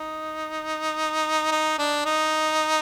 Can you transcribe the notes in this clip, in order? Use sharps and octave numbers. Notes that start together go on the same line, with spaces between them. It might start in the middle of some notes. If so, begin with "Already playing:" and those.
Already playing: D#4
D#4
D4
D#4